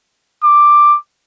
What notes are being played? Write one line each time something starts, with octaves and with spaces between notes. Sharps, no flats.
D6